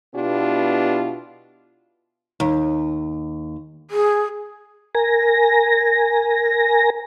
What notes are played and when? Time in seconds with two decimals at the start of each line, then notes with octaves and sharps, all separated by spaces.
0.15 B2 B3 D4 E4 F4 G4
2.40 D#2
3.91 G#4
4.95 A#4 G#5 A#6